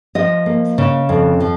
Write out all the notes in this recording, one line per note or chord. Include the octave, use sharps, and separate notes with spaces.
F3 D#5
A#3
C#3
F2
F3